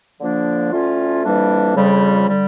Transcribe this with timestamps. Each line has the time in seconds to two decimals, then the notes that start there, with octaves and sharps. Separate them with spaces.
0.20 D3 F3 A#3 D4
0.72 D2 D3 A3 C#4 F4
1.24 F2 E3 G3 A#3 D4
1.76 F2 C#3 G3
2.28 D3 G3